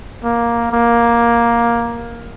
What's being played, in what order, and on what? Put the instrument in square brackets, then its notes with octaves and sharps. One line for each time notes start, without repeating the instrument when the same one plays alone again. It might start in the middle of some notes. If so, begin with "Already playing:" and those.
[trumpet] A#3
A#3